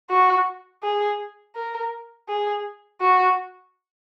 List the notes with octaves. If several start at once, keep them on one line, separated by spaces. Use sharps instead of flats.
F#4
G#4
A#4
G#4
F#4